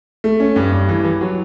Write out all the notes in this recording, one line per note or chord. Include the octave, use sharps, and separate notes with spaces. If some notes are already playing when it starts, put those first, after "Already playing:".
A3
C#4
G2
G2
E3
E3
F#3